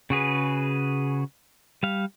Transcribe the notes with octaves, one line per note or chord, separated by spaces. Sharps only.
C#3 F#4 G#4 B4
G3 F5